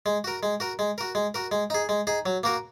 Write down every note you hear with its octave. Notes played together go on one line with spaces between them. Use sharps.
G#3
F#4 A#4
G#3
F#4 A#4
G#3
F#4 A#4
G#3
F#4 A#4
G#3
D#4 G#4
G#3
D#4 G#4
F#3
A#3 F#4 A#4